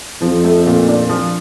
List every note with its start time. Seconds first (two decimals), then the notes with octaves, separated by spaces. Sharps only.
0.21 F2 F3
0.44 A3
0.66 A#2
0.88 D4
1.09 F3